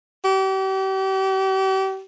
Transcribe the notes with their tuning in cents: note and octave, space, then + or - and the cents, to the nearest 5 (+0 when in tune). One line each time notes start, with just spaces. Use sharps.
G4 -40